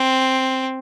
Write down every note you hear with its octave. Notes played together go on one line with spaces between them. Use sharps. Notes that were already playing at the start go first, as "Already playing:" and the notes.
Already playing: C4